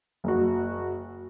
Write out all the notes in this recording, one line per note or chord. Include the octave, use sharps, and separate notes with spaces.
F#1 F#4